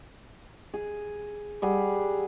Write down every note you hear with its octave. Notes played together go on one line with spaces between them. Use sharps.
G#4
G3 G#4 F#5